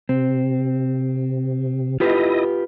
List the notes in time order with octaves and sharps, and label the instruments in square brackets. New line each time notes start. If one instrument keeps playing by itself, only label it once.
[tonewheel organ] C3 [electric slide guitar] C4
[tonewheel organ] E4 D#5 [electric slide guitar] F4 G4 B4